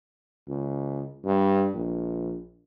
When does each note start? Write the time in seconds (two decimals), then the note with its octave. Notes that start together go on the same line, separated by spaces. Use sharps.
0.48 C#2
1.24 G2
1.75 A#1